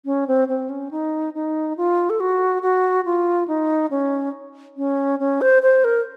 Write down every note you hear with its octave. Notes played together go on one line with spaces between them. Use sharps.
C#4
C4
C4
C#4
D#4
D#4
F4
A4
F#4
F#4
F4
D#4
C#4
C#4
C#4
C5
C5
A#4